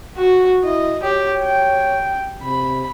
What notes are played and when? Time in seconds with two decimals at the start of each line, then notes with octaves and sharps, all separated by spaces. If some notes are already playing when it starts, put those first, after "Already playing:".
0.18 F#4
0.64 E4 D#5
1.03 G4 C#5
1.43 G5
2.43 C3 B5